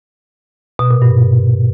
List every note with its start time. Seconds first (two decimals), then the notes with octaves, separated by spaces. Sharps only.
0.79 B2
0.91 A#2
1.02 G2